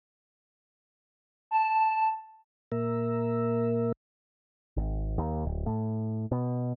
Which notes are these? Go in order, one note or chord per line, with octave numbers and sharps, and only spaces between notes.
A5
A#2 A#3 A#4 E5
G#1
D#2
D1
A2
B2